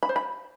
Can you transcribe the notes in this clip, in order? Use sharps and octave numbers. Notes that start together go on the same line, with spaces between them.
B5
C5
B5